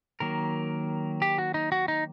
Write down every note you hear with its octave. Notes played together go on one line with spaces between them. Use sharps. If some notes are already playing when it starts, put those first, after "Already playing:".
D#3 F#3 A#3 A#4
G4
F#4
D#4
F#4
D#4